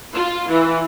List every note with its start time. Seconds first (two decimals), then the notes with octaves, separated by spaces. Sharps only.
0.14 F4
0.49 E3